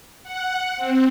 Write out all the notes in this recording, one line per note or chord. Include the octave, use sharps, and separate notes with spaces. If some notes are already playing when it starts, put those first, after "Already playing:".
F#5
C4